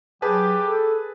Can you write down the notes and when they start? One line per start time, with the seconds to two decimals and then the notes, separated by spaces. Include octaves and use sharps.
0.22 F#3 G4 G#4 B4 A5
0.64 A4